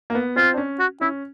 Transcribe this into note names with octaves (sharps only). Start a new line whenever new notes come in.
A#3
B3
C4 F4
D4
C#4
F#4
C#4 E4